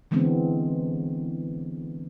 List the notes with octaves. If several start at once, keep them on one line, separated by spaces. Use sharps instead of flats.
D3 E3 G#3 B3 C4 D4